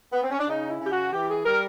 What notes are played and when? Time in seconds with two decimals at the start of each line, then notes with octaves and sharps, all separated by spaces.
0.12 B3
0.22 C4
0.31 C#4
0.38 D4
0.48 C#3 D#4
0.70 E4
0.80 C#3
0.85 G4
0.91 F#4
1.12 E3 G4
1.29 G#4
1.45 G3 A#4